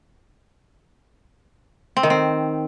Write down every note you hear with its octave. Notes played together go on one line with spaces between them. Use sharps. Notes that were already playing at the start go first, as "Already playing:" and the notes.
C4
D#3
C4